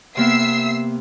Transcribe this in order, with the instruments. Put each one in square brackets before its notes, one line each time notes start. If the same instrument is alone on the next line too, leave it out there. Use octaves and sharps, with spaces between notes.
[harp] C3 A#3 B3 [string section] E5 E6 C7